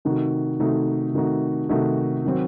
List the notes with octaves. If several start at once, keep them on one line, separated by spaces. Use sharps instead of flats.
C3 D#3 A3 D#4 F#4
C3 D#3 A3 D#4 F#4
C3 D#3 A3 D#4 F#4
C3 D#3 A3 D#4 F#4
D#3 F#3 C4 F#4